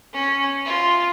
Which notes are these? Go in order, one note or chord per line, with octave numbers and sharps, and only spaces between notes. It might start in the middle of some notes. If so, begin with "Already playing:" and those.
C#4
F4